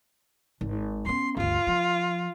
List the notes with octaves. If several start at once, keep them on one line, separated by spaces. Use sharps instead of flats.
G#1
B3 C#4 C6
G1 D2 F4
F3